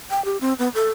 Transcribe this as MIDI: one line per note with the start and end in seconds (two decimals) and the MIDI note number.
0.11 0.24 79
0.25 0.37 67
0.41 0.53 60
0.59 0.68 59
0.75 0.89 69